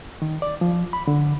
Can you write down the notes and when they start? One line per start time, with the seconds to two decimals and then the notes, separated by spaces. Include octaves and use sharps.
0.22 D#3
0.42 D5
0.61 F3
0.93 B5
1.08 D3